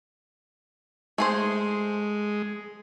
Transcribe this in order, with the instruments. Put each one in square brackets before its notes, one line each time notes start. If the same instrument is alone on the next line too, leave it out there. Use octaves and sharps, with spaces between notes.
[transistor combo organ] G#3 [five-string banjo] A3 G#4 C5